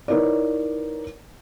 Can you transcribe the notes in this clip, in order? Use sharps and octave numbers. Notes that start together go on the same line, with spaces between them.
D#4 E4 A#4 B4 C#5 D5